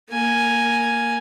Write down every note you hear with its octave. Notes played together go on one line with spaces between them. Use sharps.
A#3 G#5